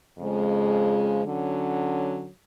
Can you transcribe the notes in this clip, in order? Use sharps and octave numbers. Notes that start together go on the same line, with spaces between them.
F2 C#3 F3 G#3
D3 F#3 C#4